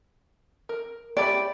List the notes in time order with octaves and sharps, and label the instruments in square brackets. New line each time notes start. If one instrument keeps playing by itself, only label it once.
[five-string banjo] A#4
[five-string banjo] E4 G4 B5 [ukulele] D5